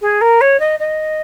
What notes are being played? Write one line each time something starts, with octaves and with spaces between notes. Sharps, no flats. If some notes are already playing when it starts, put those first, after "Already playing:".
G#4
A#4
C#5
D#5
D#5